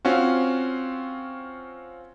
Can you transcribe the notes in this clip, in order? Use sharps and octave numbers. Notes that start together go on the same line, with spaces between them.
C4 C#4 F4 F#4